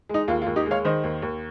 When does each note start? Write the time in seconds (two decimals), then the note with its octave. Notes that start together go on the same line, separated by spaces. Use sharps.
0.09 G#3 D#4
0.28 D#2 F4
0.42 F4
0.46 D#2
0.56 D#4 G4
0.66 G#3
0.71 C#5 F5
0.85 D#3 C5 D#5
1.04 D#2
1.22 D#2